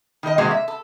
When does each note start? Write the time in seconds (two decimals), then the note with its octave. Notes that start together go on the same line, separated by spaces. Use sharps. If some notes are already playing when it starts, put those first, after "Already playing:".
0.23 D#3 D#4 A#4 D#5
0.38 C3 D#3 G#3 A#3 C4 F#4
0.51 E5
0.68 A4